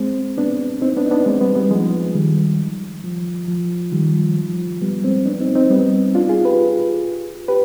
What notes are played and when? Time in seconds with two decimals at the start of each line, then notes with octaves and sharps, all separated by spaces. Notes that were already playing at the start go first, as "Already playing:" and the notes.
Already playing: G#3 C4
0.38 B3 D4
0.82 C4 D#4
0.97 B3 D4
1.06 D#4
1.11 B3 D4
1.26 G#3 C4
1.41 G3 B3
1.56 G3 B3
1.70 F3 G#3
2.15 D#3 G3
3.04 F3
3.48 F3
3.92 D#3 G3
4.15 F3
4.37 F3
4.81 G3 B3
5.03 G#3 C4
5.26 B3 D4
5.41 C4 D#4
5.55 C4 D#4
5.70 G3 B3
6.15 D4 F4
6.29 F4 G#4
6.45 G4 B4
7.48 G4 B4